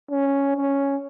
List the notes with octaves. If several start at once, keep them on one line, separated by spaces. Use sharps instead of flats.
C#4
C#4